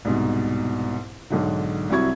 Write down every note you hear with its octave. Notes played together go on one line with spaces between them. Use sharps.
C2 G#2 B2
B1 G#2 D3
C2 C3 F#3 E4 C#6 G#6